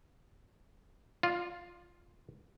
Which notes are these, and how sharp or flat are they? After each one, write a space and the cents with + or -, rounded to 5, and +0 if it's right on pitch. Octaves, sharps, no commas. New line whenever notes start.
F4 +0 D5 +30